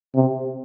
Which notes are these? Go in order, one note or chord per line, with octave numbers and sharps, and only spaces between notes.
C3